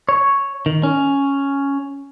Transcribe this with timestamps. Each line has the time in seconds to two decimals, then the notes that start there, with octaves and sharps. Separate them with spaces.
0.09 C#5
0.66 D#3
0.83 C#4